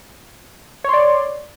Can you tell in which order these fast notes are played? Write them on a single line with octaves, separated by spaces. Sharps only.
C#5 C6 D5